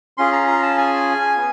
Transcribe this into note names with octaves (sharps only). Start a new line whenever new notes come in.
C#4 F4 G#4 C6
A#5
A#5
A5
G#5
B3